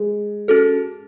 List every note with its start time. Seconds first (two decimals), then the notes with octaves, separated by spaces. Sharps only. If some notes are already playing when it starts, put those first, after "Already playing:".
Already playing: G#3
0.48 C#4 F#4 A4